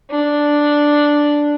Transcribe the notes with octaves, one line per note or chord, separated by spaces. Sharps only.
D4